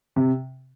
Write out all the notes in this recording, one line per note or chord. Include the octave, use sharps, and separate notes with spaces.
C3